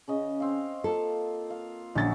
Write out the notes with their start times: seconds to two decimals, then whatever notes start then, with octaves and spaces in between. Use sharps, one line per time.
0.08 C#3 C#4 D#5
0.40 C4 F5
0.84 A#3 F4 A4
1.50 F5
1.95 A#1 F#3 C#4 A6